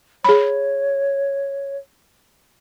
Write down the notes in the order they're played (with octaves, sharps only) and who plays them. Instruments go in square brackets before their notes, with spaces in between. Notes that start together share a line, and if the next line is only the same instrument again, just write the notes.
[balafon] G#4 B5 [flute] C#5